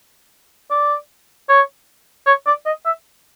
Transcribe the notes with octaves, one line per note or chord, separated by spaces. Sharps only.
D5
C#5
C#5
D5
D#5
E5